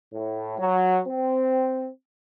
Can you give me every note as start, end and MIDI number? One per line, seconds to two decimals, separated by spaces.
0.12 0.55 45
0.58 0.99 54
1.06 1.87 60